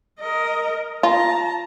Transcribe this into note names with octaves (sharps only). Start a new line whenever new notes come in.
A#4 D#5
F4 A5 A#5